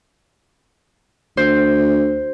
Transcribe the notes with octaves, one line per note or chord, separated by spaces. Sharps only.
D2 C5